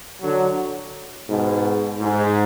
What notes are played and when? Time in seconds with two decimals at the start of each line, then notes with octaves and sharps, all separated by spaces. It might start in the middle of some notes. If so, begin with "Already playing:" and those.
0.22 D3 F#3
1.29 G#2 B2
2.00 G#2